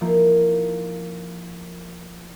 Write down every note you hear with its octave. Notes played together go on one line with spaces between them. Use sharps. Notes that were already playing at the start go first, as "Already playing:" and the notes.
F3 A#3 D#4 E4